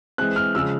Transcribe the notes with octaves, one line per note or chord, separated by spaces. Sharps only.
E3 G#3 C4 F#6
F6
C#3 F3 G#3 E6